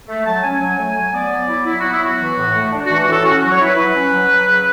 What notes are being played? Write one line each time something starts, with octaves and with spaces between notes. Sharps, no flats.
A3
F#3 A5
C#4 G#5
F#3
A3
F#3
B3 D5
F#3
E4
F#3 E4
B3 F#4
E4
F#3 F#4
E3
A2
A3
D4
E3 F#4
F#4
A2 A4
C#4 F#4
F#3 F#4
C#5
E4 B4
F#3
C#4
F#3
F#3
C#3